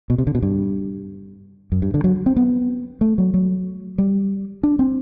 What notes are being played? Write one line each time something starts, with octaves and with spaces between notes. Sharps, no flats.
B2
C3
D3
B2
G2
F#2
G2
D3
F#3
C4
B3
A3
F#3
F#3
G3
D4
C4